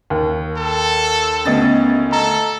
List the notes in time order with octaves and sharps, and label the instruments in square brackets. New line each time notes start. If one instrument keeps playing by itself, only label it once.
[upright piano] D#2
[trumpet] A4
[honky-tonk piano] D2 D#5 A6 [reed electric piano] B3 C#4
[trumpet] A4 [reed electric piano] A#5